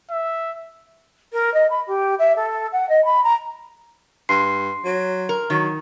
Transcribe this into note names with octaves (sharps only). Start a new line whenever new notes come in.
E5
A#4
D#5
B5
G4
E5
A4
F#5
D#5
B5
A#5
G2 C6 C7
F#3
A#4
D#3 F#3